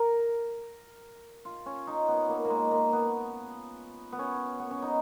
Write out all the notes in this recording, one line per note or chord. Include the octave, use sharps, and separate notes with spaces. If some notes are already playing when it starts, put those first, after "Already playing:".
Already playing: A#4
F4
C#4
D#4
B3
A#3
A#3
G#3
A#3
B3
B3
C#4
B3
C#4
D#4